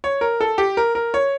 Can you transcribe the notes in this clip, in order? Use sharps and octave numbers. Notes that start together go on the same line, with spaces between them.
C#5
A#4
A4
G4
A#4
A#4
C#5